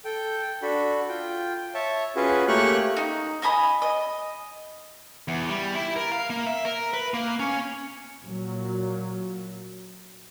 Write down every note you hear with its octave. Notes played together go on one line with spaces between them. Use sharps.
A4 G5
D4 F#4 A4 B5
F4 G5
C#5 E5 A5
C#4 F4 F#4 G#4 B4
A3 A#3 G4 C#5 C#6 F#6
D#4
D#5 G#5 B5 D#6
D#5
E2
G3
E4
A#4
F5
A#3
E5
A#4
B4
A#3
C#4
A#2 F#3